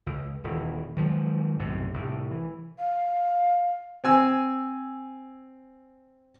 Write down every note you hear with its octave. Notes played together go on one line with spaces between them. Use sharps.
C#2
D#1 E3
D#3 F3 F#3 G#3
B1 F#2 A2 C3
C2 A2
E3
F5
C4 G#5 E6